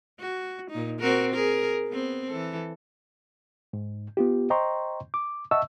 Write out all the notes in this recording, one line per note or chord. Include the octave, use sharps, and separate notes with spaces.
F#4
A#2 D#4
C4 F#4 A#4
G#4 A#4
B3 C4
E3 A4
G#2
B3 F4 G4
C5 D#5 G5 A#5 C6 C#6
D6
D#5 E5 F#5 A5 C#6 E6